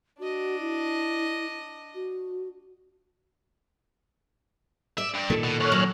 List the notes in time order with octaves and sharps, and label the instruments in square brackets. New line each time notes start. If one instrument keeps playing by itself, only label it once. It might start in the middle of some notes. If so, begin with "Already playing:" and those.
[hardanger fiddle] D4 D#5 [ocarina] F#4
[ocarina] E4
F#4
[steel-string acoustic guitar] D5 [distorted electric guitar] E5
[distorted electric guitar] G2
[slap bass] A#2 D#3 [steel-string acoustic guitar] A4
[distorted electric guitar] B2
[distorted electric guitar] F#2 [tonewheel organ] C#5 F6 F#6
[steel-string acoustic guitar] F#3